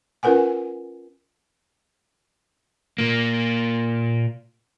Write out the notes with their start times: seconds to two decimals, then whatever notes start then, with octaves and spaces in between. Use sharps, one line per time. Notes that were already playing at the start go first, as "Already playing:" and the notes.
0.23 C#4 F4 A#4 B4 F#5 G#5
2.98 A#2 A#3